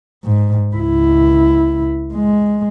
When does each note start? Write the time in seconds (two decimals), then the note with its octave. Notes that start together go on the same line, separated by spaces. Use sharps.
0.25 G#2
0.74 C#2 E4
2.14 G#3